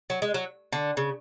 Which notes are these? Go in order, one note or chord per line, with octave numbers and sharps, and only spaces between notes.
F#3
G#3
F#3
D3
C#3